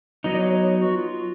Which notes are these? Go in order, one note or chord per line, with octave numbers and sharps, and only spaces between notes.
F#3 B3 D#4 D#5
D5
C#5
C#5
F#4
F4